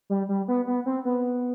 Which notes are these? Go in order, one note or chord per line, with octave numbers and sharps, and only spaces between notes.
G3
G3
B3
B3
C4
B3